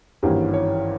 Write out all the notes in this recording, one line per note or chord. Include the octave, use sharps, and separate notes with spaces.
G#1 G2 E3 A#3 C#4 G4
C#5